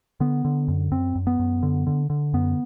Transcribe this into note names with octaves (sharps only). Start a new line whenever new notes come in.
D3 B3
D3
F#2
F#2 C4
F#2
B3
F#2
D3
D3
D3
F#2 B3